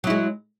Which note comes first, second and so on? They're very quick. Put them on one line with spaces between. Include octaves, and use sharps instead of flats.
F#3 E4 G#3